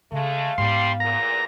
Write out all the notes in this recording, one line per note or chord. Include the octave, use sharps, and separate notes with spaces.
C#3 G#3 A3 F5
G#2 C3 G3 B3 C6
E2 A#2 A#5